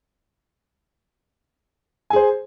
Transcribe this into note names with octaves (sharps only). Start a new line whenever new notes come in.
G#4 C5 G#5